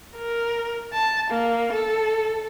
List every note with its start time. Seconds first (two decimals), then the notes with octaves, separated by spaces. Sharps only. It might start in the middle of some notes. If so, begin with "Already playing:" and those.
0.16 A#4
0.93 A5
1.30 A#3
1.72 A4